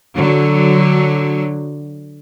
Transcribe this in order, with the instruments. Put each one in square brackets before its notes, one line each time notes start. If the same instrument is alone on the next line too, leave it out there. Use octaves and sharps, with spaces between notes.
[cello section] D3 F#3